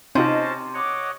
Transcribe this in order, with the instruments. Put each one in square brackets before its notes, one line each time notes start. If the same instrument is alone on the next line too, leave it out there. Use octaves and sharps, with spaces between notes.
[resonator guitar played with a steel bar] C3 [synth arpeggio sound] C4 D#4 F4 [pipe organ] C#4 C5 A5 [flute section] D#5
[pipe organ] C#5 D#5 F#5 [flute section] D6